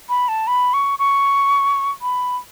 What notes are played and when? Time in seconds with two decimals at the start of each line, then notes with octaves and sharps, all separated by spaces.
0.09 B5
0.28 A5
0.47 B5
0.74 C#6
0.99 C#6
2.02 B5